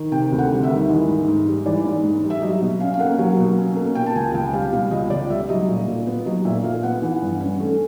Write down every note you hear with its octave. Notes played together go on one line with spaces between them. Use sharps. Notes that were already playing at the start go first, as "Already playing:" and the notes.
Already playing: D#3
C3 G5
D2
F#5
G3
E5
D#3
E3 D#5
G#2
G#2
G3
E3 D5
G#2
G#2
G3
E5
F#3 D#5
B2
C#4 F5
F5
A#3 F#5
F#3
B2
C#4
A#3
B2 G5
A5
C#2 G#5
C#2 G5
G3 F5
B2 F5
C#2 D#5
C#2 D5
G3 E5
F#3 D#5
A#2
A#2
B3
F#3 D#5
A#2 E5
A#2 F5
B3 F#5
E3
G2
C#4
A3